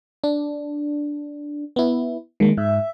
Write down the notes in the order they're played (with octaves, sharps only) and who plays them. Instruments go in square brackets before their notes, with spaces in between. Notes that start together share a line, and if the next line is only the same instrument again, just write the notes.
[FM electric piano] D4
B3 E4
[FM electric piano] D#3 A#3 [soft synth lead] G#3
[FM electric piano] G#2 [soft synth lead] E5